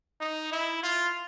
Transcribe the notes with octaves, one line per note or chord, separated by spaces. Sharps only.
D#4
E4
F4